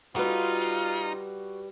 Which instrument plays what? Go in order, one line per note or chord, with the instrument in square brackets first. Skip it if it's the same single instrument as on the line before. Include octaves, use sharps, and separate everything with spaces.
[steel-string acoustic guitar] G3 B4 [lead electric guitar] D#4 [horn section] F4 [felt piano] F#4